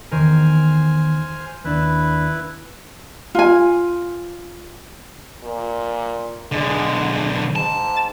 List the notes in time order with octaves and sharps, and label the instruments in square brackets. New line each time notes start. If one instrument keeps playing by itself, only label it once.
[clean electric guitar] E2 D#3 A#4 [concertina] C5 G#5 F6
[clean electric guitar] D#2 D4 [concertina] E4 B4
[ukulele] F4 G#5
[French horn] A#2
[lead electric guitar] B1 D3 [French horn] G#3
[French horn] G#2 [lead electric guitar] A5